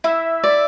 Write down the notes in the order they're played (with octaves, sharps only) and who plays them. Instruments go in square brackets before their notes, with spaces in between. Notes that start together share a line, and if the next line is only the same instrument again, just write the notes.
[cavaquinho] E4 [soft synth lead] E5
[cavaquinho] D5